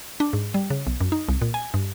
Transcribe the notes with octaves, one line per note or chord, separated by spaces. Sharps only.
D4
G#2
G3
C#3
B1
F#2
D#4
C2
A#2
G#5
G2